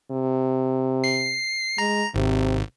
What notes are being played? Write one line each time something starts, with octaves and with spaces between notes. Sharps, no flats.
C3
C7
G#3 A#5
G#1 C3